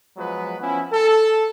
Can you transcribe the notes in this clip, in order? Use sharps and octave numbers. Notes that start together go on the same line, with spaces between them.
F3 F#3 G#3 B3 B4
F3 B3 C#4 E4
A4